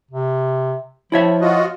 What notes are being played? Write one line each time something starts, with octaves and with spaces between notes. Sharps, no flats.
C3
F3 E4 C#5 E5
F4 F#4 D#5